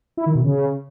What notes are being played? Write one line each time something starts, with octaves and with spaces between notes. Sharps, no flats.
E4
D#3
B2
C#3